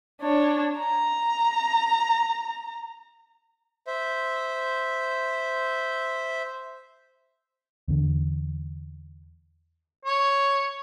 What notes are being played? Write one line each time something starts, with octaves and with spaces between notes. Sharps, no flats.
D4 C#5
A#5
C5 E5
E2 D3
C#5